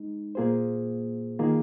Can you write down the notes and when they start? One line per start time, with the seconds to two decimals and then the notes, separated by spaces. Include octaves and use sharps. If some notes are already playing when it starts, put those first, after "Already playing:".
Already playing: G#3 D#4
0.35 A#2 A#3 F4 G#4 C5
1.39 D#3 A#3 F4 G#4